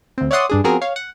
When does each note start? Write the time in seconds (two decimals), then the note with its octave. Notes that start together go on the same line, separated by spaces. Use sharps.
0.18 D2 C4
0.31 C#5 D5 E5 F#5 C6 D#6
0.49 G2 D4 G#4
0.64 F3 B3 C4 F#4 G#4 A#4
0.82 C#5 F5
0.96 F#5